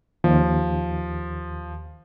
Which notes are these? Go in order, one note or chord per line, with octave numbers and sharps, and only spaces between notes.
D#2 F3